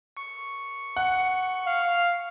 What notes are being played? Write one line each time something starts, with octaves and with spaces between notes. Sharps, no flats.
C#6
F#5
F5